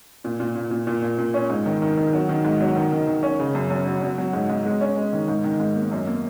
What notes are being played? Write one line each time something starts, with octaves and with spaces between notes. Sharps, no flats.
A#2
A#2
A#2
A#2
A#2
A#2
A#2
C#4
G#2
D#3
D#3
D#3
F#3
D#3
G#2
F#3
D#3
D#3
D#3
C#4
C#3
F#2
F#2
F#3
F#3
F#3
G#2
G#2
G#3
C#4
G#3
D#3
G#2
D#3
G#2
A#3
F#2
A#3